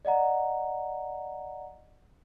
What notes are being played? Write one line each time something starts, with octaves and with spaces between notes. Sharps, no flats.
D5 D#5 F#5 A#5